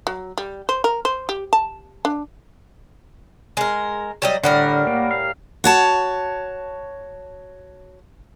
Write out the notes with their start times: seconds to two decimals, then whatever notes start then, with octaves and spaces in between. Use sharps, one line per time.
0.07 F#3
0.38 G3
0.69 C5
0.84 A#4
1.05 C5
1.29 G4
1.53 A5
2.05 D4
3.57 G#3 A#4
4.22 F#3 G3 D#5
4.44 A2 D3 G3 A#4 D5 F#5 B5
4.87 A#3
5.11 F5
5.64 F#4 C#5 A5